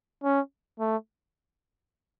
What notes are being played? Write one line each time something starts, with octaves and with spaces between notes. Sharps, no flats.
C#4
A3